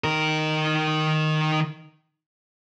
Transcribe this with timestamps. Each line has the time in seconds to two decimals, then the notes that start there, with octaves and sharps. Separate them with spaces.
0.04 D#3 A#4